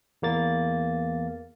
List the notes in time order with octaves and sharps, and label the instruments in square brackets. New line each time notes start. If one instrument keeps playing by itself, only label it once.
[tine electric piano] E2 A#3 A6